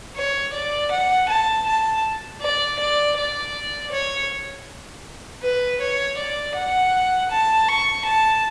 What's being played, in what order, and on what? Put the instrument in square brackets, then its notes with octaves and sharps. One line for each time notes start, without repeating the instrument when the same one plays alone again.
[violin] C#5
D5
F#5
A5
A5
D5
D5
D5
C#5
B4
C#5
D5
F#5
A5
C#6
A5